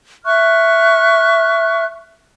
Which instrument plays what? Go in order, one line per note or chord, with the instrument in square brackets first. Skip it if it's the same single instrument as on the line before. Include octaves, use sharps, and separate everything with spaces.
[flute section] E5 C#6 F6 F#6